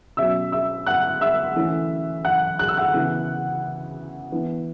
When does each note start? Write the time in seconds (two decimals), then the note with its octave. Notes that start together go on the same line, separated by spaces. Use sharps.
0.17 B2 F#3 C#4 E5 E6
0.52 E5 E6
0.86 F#5 F#6
1.21 E5 E6
1.56 E3 A3 C#4
2.25 F#5 F#6
2.59 F#6
2.68 E6
2.77 F#5 F#6
2.94 C#3 E3 B3
4.32 E3 B3